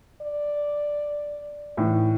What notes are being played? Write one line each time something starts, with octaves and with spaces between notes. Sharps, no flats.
D5
A2 E3